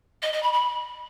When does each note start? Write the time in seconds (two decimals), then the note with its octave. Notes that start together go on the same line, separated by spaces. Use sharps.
0.22 D#5
0.32 D#5
0.42 B5
0.52 B5